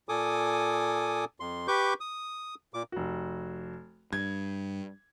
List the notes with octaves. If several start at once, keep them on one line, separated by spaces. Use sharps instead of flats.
A#2 A4 G#5 D6 D#6
F2 C6
G4 B4 C#6 D6 G6
D#6
A#2 D6
F1 F#4
G2 G#6